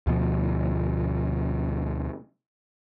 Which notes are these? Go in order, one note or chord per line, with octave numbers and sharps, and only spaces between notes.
D2 B2 F3